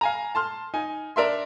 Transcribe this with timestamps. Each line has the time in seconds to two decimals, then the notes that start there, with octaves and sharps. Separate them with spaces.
0.01 F5 G#5 A#5
0.35 A5 C6 F6
0.74 D#4 G#5
1.16 D4 A#4 E5 C6